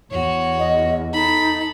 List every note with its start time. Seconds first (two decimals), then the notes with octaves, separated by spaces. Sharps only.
0.11 E2 F#4 C#5
0.59 D#5
1.13 D#4 A4 B5